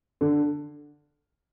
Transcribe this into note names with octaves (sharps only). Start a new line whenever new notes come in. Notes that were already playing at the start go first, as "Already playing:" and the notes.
D3